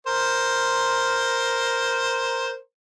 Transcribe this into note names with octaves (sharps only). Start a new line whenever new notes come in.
A#4 C5